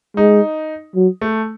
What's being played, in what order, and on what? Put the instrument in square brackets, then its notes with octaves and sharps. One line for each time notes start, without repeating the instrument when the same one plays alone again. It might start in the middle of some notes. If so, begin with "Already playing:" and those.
[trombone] G#3 [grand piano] D#4
[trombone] F#3
[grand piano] A3